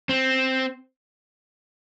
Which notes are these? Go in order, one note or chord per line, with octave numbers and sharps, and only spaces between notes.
C4